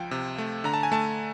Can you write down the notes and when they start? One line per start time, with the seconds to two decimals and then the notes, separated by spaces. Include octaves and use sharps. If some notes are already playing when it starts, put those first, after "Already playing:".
Already playing: C#2 F3 G5
0.11 C3
0.38 A3
0.64 D3 A#5
0.74 A5
0.83 G#5
0.92 A3 A5